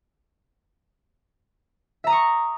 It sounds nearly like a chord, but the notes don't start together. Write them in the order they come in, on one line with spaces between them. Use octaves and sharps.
E5 A#5 D#6 C#6